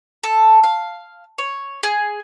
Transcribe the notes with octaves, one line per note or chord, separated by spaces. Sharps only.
A4
F5
C#5
G#4